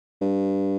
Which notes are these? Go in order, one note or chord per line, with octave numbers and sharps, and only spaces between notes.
G2